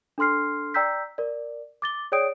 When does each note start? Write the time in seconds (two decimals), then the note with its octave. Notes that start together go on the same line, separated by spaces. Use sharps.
0.18 D4 A4 C6 F6 C7
0.74 D5 G5 A#5 E6 G6 B6
1.18 A#4 D5
1.82 D6 A6 G7
2.12 G#4 C#5 D5 G5 D#6 D7